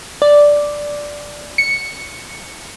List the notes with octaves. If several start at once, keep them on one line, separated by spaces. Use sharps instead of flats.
D5
C#7